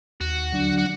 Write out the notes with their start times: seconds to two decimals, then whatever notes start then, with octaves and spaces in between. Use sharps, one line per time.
0.20 D#2 F#4
0.52 D3 F#3 D4
0.78 F#4